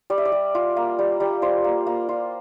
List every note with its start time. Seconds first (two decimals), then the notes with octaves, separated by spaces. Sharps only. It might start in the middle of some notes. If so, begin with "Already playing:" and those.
0.10 G3 D5
0.18 E5
0.25 D5
0.32 G3
0.55 F4
0.76 A#3
0.99 G3
1.20 G3
1.42 F4 C5
1.64 A#3
1.87 A#3
2.09 F4